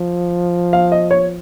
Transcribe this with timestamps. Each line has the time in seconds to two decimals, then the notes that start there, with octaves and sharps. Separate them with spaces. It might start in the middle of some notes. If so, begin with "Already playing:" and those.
Already playing: F3
0.73 F5
0.92 D#5
1.11 C#5